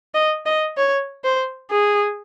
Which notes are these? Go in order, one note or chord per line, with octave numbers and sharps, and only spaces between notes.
D#5
D#5
C#5
C5
G#4